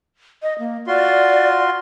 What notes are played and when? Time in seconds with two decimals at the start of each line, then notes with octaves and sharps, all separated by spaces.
0.43 D#5
0.59 A#3
0.87 F4 F#4 D5 C6